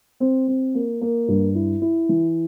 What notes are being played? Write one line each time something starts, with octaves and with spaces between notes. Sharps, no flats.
C4
C4
A#3
A#3
G2
E4
E4
E3